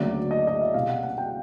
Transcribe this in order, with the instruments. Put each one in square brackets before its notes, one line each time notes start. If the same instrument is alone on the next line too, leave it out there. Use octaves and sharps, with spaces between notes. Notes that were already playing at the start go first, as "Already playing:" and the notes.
Already playing: [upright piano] D2 C#3 F#3 A#3 D5
D#5
D#5
E5
C2 B2 G3 A#3 F5
F#5
F#5
G5